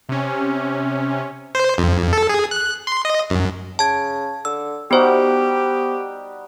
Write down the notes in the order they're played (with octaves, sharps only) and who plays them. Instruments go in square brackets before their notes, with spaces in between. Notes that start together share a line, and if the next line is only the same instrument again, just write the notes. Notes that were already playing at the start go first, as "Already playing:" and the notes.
[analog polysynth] C3 C#4
[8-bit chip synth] C5
F2
A4
G#4
F#6
C6
D#5
F#2
[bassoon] C#3 [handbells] A5 G#6
[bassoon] D3 [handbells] E6
[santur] G3 D#4 F#4 [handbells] B3 C5 [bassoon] G4